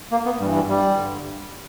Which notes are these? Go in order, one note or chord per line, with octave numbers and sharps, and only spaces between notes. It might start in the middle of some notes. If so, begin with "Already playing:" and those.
A#3
B3
G2 E3 G3
G3
G3
G2 D3